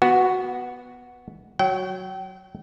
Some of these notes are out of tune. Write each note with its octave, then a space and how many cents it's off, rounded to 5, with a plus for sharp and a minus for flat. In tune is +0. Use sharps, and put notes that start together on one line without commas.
B3 +0 F#4 +0
F#3 +0 G5 -35